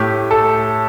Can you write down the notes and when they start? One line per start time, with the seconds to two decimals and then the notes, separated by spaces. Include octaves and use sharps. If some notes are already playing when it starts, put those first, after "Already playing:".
Already playing: A2 A3 G4
0.31 A4